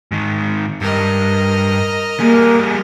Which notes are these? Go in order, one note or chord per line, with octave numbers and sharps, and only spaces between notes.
G#2 D#3
G2 A#4 D#5
G3 A#3 G#4